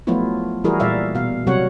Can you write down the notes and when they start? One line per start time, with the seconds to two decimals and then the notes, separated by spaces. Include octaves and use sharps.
0.07 F3 F#3 A3 B3 E4 F4
0.64 E3 G3 E4 F#4 G#4 A#4
0.80 A#2 G3 D5 E5 F5
1.15 B2 F5
1.47 C3 F#3 G3 F#4 C#5 F#5